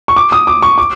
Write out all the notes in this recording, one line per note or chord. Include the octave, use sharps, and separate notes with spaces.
C#6
D6
D#6
D6
C#6
D6